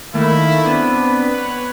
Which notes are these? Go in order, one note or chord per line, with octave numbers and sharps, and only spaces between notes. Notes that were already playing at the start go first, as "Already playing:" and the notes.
D#3 A3 A#3 E4
B3 C4 D4
B4
C#5 F#5